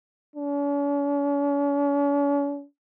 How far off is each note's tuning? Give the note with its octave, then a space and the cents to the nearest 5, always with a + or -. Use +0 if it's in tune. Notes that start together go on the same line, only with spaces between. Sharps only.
C#4 +45